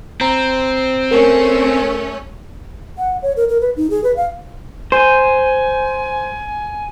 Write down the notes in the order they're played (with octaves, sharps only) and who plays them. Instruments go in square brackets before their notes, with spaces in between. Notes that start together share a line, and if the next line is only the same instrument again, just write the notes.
[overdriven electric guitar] C4 [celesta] A#5
[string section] A3 C#4 [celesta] A#4
[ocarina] F#5
C#5
A#4
A#4
B4
D#4
G#4
B4
F5
[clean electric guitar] C5 [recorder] G#5